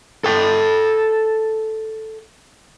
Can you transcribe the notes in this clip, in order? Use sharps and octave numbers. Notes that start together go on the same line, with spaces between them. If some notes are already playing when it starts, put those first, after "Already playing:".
A4 G5